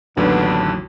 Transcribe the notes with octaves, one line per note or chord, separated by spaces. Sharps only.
A1 D#2 D3 F#3 B3 D4